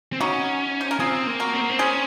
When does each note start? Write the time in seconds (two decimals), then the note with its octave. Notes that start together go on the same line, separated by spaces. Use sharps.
0.13 C4
0.20 C#4 D#4 F#4
0.81 C5
0.91 A#4
1.00 C4 F4 G#4
1.27 A#3
1.40 F#4 A#4
1.54 C4
1.61 A#3
1.70 C4
1.79 C#4 G#4 C5